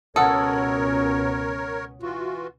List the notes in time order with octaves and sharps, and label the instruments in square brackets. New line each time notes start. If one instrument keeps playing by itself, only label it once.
[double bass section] C#2 B2 C#4 [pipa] A4 [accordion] A#4 C#5 [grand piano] F#5 D#6
[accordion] E3 F4 F#4